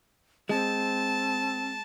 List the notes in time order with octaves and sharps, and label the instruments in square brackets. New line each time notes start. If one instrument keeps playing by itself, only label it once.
[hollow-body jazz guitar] G#3 [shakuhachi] C4 [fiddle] A5